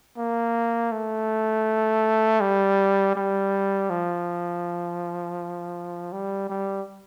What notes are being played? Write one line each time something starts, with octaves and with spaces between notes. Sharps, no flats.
A#3
A3
G3
G3
F3
G3
G3